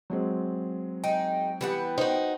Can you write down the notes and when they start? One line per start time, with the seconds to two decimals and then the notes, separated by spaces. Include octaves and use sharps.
0.10 F#3 G#3 C4
1.04 D#4 G#4 G5
1.61 E3 G3 B3 F#5
1.98 D#4 F#4 C5